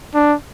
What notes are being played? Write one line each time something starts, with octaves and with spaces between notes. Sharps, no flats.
D4